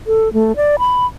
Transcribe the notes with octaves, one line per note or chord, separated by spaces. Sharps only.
A4
A3
D5
B5